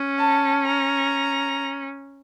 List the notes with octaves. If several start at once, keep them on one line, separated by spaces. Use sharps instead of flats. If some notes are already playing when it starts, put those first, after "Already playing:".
Already playing: C#4
A5
A#5